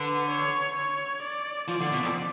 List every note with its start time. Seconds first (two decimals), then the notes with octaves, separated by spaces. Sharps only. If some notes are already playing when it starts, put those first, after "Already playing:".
Already playing: D3 B4
0.29 C#5
0.75 C#5
1.22 D5
1.68 F3 D5
1.80 D3
1.92 B2
2.03 F2